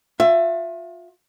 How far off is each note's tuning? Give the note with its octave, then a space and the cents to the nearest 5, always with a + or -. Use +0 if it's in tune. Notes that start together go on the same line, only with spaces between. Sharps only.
F4 +35 E5 +20